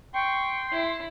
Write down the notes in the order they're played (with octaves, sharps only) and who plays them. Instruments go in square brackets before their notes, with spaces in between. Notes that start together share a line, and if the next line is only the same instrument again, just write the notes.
[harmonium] G5 [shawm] C6 [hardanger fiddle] C#6
[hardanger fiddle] E4